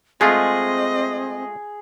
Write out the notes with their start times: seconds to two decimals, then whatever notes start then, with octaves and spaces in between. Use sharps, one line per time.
0.21 G#3 A3 C4 F4 G#4 D#5